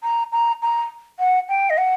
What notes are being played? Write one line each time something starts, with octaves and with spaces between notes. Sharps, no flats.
A#5
A#5
A#5
F#5
G5
D#5
F#5